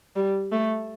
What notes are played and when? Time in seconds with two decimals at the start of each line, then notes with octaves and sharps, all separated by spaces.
0.16 G3
0.52 A3